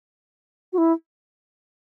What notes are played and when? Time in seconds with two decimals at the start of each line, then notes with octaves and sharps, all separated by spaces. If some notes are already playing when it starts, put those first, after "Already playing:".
0.73 F#4
0.78 E4